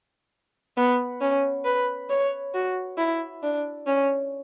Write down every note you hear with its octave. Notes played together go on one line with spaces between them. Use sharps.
B3
C#4
B4
C#5
F#4
E4
D4
C#4